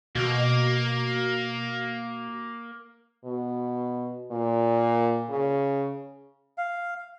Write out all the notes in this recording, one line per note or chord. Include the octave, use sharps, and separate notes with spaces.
B2 A#3
B2
A#2
C#3
F5